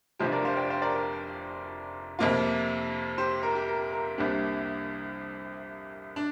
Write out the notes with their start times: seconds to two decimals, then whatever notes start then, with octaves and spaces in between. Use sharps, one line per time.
0.19 F1 F2 C3 F3 D4 G4 C5
0.32 A#4 D5
0.45 C5 F5
0.57 D5 G5
0.70 C5 F5
0.82 A#4 D5
0.94 A#4
2.19 F2 C3 A#3 F4
3.18 G4 C5
3.43 A#4
3.55 G4
3.68 A#4
3.93 A#4
4.18 C2 C3 A#3 D4 G4
6.16 D4